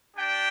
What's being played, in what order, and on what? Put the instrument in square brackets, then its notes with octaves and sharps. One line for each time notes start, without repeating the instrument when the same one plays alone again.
[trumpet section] D4 G4 D5 G5